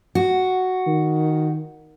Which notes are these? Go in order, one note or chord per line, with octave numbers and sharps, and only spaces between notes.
F#4
D#3